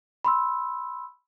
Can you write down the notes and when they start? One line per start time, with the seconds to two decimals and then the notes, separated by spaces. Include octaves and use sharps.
0.25 B5 C6 E6